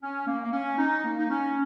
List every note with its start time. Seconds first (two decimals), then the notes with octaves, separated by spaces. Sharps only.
0.01 C#4
0.27 A#3
0.44 A#3
0.52 C#4
0.79 D#4
1.04 A#3
1.18 D#4
1.30 C#4